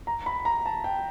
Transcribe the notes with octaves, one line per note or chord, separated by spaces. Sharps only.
A#5
B5
A#5
A5
G5